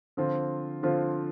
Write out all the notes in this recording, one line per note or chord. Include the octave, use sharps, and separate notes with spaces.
D3 F3 C4 F4
D3 F3 C4 F4